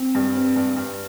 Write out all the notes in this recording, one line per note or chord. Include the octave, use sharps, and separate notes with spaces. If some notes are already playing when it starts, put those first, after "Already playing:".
Already playing: C4
G2
C4
G2
G2